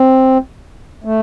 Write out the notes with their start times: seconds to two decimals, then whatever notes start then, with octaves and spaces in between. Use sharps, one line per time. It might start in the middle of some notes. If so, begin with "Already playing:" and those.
Already playing: C4
1.04 A3